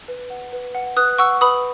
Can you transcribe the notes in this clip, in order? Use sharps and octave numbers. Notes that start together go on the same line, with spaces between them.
B4
F#5
B4
F#5
B4 D#6 F#6
F#5 C#6 E6
B4 B5 D#6